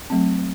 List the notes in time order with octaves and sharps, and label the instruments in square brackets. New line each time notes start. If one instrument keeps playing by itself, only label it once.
[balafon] F#3 A3 C4